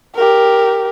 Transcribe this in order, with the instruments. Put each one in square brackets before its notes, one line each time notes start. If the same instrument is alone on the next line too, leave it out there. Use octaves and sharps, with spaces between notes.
[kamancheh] G4 A#4